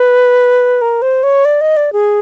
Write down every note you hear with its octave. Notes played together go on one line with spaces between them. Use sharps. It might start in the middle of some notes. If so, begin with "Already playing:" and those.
Already playing: B4
A#4
C5
C#5
D5
D#5
D5
G#4